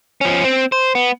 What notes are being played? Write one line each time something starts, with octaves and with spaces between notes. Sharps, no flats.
F3 C#4
C4
C5
B3